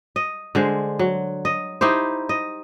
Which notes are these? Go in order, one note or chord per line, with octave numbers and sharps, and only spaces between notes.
D#5
D3 G#3 C5
F#3
D#5
D#4 E4 G4 C5
D#5